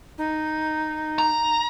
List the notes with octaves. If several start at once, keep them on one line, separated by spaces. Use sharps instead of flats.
D#4
A#5